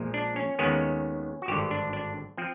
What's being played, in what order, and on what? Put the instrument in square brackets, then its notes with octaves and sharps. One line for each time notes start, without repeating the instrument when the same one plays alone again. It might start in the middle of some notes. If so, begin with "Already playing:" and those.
Already playing: [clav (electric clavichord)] A#1 A#2 F3 G#3
D4
C#4
D#2 D#3 G#3 B3 C#4
F#4
G#1 G2 D3 G4
D4
D4
F3 C4